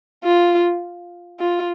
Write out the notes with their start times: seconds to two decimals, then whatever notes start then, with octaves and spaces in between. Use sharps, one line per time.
0.24 F4
1.40 F4